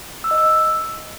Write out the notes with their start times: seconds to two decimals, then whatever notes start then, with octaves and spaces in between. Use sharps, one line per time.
0.24 E6
0.31 D#5
0.38 E6